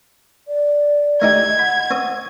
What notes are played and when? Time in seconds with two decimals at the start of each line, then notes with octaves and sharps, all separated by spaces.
0.48 D5
1.22 A3 D#4 G4 G#6
1.59 F#5 B5
1.91 C4 C#5 D#6